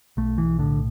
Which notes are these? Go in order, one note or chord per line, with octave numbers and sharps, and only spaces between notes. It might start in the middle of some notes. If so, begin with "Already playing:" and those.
B1 A3
E3
A2 D3